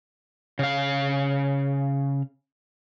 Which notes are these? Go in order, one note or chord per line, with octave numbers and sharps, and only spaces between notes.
C#3 F5